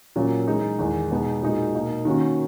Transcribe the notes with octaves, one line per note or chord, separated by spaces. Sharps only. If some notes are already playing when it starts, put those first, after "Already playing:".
A#2 F#3 C#4
E3 G#3 D#4
E2 D#3 G#3
B2 G#3 B3 D#4
A#2 G#3 D#4 F#4
B2 A#3 D#4
D#3 A#3 C#4 F#4